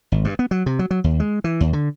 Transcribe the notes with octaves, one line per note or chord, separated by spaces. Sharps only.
G#1
G2
B3
F#3
C3
F#3
F#3
D#2
G#3
E3
D#2
D3